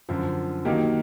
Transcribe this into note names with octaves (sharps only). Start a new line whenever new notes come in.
F#2 D3 F3
D#3 F#3 A#3 D#4 G4